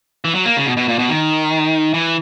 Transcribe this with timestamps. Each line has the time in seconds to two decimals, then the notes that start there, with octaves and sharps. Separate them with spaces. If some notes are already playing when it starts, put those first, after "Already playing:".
0.25 E3
0.35 F#3
0.45 A#3
0.56 C#3
0.66 B2
0.77 B2
0.88 A#2
0.99 B2
1.09 D#3
1.94 E3